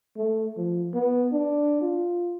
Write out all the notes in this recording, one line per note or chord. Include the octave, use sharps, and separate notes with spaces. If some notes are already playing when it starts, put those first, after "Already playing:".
A3
F3
B3
D4
F4